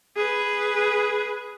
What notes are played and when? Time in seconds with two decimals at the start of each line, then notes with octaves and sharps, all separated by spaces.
0.16 G#4 B4